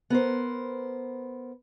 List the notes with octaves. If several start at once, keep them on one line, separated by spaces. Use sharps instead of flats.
B3 A#4 C5